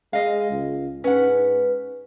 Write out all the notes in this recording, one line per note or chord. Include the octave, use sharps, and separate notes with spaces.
G#3 D#5 F5
C#2
G#2 C#4 B4 F#5